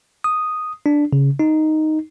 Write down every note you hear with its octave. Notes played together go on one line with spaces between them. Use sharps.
D#6
D4
C#3
D#4